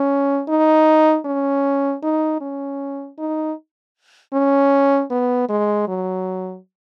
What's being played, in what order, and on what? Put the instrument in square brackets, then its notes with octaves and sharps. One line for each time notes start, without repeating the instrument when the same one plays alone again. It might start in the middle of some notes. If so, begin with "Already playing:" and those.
Already playing: [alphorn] C#4
D#4
C#4
D#4
C#4
D#4
C#4
B3
G#3
F#3